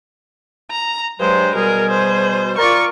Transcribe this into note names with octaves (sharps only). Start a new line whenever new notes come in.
A#5
G2 F#3 G#3 C5
B2 G3 G#4 A#4
C5
F4 A#4 D5 C#6